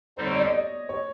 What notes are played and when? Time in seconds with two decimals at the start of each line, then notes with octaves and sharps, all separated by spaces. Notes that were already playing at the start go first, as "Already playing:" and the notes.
0.17 D3 G3 C4 D#4 C5
0.26 C#5
0.35 D5
0.44 D#5
0.53 D5
0.89 C#5